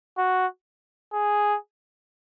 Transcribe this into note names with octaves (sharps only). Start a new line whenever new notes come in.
F#4
G#4